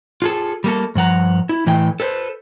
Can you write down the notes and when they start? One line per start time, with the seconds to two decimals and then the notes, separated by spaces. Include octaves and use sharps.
0.22 F4 G#4 A4
0.64 G3 A#3 A4
0.95 G2 F3 F#5 A#5
1.49 E4
1.67 A2 E3 A3 E4 G5
2.00 A4 B4 C5